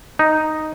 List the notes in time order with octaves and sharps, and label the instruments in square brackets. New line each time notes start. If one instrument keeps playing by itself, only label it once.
[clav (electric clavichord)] D#4